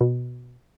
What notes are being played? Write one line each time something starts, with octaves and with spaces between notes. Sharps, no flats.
B2